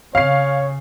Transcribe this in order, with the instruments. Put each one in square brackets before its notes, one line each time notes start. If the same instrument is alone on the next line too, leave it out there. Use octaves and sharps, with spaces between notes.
[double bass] C#3 [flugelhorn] C#5 [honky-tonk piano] F5 C7